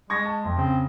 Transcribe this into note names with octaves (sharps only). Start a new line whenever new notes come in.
G#3 C#6 G#6 A#6
A5
F2
C#3 C4